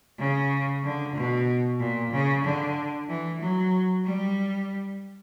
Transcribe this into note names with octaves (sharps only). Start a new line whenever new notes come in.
C#3
D3
B2
A#2
C#3
D3
E3
F#3
G3